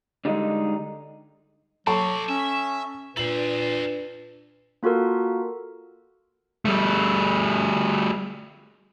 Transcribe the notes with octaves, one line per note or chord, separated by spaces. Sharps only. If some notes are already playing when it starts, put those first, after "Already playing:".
D3 G3 G#3 D#4
F#3 A4 C5 D5 A5 C#6
C#4 E5
A#2 D4 A4 B4 C5 F#7
A#3 F4 F#4 A4 A#4
G3 A3